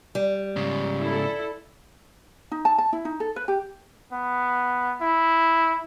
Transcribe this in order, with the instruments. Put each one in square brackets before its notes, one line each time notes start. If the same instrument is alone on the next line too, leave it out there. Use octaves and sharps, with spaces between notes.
[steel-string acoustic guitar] G3
[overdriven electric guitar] G#2 C#3
[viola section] E4 A4
[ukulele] D#4
A5
A5
E4
D#4
A4
B4
G4
[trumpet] B3
E4